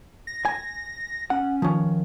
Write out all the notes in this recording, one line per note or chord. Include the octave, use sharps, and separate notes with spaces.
A#6
G#5
C#4 F#5
D#3 F3 C#4